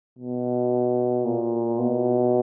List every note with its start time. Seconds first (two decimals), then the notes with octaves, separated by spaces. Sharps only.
0.19 B2
1.26 A#2
1.79 B2